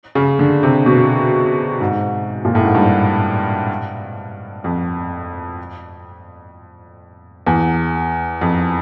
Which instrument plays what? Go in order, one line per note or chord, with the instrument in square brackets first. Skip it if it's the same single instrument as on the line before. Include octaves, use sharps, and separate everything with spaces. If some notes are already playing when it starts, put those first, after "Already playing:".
[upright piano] C#3
D3
C3
B2
G#2
A#2
A2
G#2
G2
F2
E2
F2